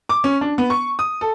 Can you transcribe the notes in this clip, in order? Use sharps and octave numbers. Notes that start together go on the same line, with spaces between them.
D6
C#4
D4
B3
C#6
D#6
A4